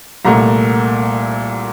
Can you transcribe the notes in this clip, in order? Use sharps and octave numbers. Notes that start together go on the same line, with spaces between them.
C2 A#2 A3 A#5